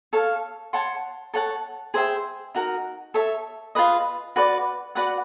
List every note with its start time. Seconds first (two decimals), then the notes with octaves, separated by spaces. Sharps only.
0.13 A4 C#5 F5
0.73 C#5 F#5 A5 C6
1.34 A4 C#5 F#5 A5
1.94 G#4 C5 E5 G5
2.55 D#4 F#4 A#4
3.14 A4 C#5 E5
3.75 F4 G#4 B4 D#5
4.36 F#4 B4 D5
4.95 F#4 B4 D5 F#5